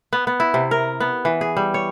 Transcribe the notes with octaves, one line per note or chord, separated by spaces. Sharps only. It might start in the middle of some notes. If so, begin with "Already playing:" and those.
B3
B3
E4
C3
A#4
B3
E3
G#4
G3
C#5